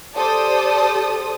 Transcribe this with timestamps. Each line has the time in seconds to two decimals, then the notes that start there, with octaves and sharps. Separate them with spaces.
0.16 G4 A4 C5 D5 A5 D#6